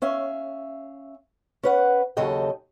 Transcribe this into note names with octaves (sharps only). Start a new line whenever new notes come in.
C#4 E5 F5
C#4 B4 F#5
D#2 C#3 F#3 A4 D#5 G5